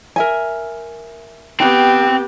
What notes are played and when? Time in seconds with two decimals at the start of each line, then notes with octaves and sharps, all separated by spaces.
0.16 A#4 E5 G#5
1.60 B3 C4 G4 G5